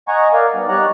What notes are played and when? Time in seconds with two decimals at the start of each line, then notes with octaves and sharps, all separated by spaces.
0.08 D#5 F#5 G#5 A#5 C#6
0.33 A#4 D5 F5 F#5 G#5
0.55 G3 B3 D#4 D5
0.69 G3 D#4 C#5 D5 A#5 F#6